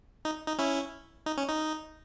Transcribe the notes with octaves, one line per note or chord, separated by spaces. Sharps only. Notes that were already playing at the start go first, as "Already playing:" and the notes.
D#4
D#4
C#4 E4
D#4
C#4
D#4